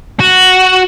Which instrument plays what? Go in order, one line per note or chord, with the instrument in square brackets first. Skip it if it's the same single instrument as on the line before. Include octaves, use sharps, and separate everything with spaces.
[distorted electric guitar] F#4